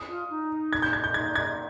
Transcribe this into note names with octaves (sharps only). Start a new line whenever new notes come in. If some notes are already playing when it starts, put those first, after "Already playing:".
Already playing: D#6
F4
D#4
G#6
G6
G#6
G6
D#4 G#6
G#6